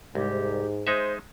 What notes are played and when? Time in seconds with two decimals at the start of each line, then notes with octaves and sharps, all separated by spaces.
0.15 C2 G#2 G4
0.87 G#3 D#4 C5 E5